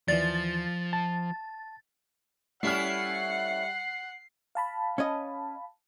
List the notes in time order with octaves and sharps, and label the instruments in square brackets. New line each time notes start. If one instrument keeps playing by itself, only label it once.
[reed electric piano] D#2 E3 [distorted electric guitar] F3 [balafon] D5 [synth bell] A6
[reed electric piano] A5
[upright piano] G3 F6 [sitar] A3 C#4 E4 [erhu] F#5 [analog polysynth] C7
[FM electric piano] F5 A5 B5
[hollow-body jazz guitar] C#4 C#5 D#5